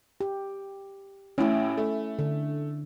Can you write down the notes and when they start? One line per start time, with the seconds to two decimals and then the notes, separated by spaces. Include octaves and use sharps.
0.21 G4
1.38 A1 A2 C#4 E4
1.77 A3
2.19 D3